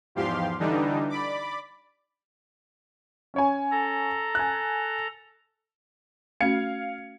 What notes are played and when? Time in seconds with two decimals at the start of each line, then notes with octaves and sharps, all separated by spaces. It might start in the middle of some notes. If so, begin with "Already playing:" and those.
0.15 E2 G#2 F3 G4 F5 C6
0.59 D3 E3 G3 D4 D#4
1.09 D5 B5 D6
3.34 C#4 C#5 G#5
3.71 A4 A#5
4.35 G#5 F#6
6.41 A3 C#4 F#4 F5 G#6 C#7